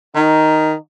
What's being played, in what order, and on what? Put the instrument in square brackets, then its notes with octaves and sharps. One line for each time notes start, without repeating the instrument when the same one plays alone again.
[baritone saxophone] D#3 [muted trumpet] D#4